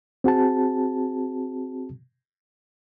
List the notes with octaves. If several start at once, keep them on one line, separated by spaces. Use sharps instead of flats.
C4 F#4 G#4 A5